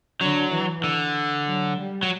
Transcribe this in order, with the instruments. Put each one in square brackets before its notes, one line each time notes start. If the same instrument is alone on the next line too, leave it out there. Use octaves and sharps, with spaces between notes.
[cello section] D3 [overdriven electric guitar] F#3
[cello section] E3
[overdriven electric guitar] D3
[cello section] F#3
G3
[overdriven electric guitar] F#3